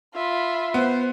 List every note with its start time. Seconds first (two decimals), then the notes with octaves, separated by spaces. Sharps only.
0.15 F4 E5 B5
0.74 B3 C5